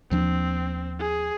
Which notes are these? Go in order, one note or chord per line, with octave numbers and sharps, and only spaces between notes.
D#2 F3 C4 D4
G#4